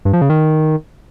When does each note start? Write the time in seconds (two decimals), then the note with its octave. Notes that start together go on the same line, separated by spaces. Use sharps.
0.05 G2
0.13 F3
0.21 C#3
0.30 D#3